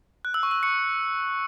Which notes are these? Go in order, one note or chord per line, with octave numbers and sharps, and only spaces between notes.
F#6
E6
C#6
E6
C#6 C#7